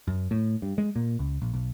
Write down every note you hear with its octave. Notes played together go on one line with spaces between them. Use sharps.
F#2
A2
G2
G#3
A#2
C#2
A#1
B1